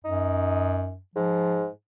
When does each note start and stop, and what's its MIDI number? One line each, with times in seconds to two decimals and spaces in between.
0.05 0.99 42
0.05 0.88 63
1.15 1.67 44
1.15 1.67 53